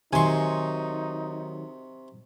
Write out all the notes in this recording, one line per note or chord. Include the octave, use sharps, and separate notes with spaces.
C3 D#3 F#3 D#4 G#5 C6 C#6